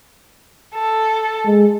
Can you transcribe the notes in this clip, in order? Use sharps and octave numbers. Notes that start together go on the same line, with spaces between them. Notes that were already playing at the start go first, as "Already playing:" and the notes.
A4
G#3